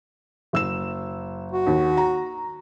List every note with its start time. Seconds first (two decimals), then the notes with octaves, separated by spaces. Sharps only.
0.53 F#1 E6 E7
1.52 F#4
1.67 D#2
1.97 A#5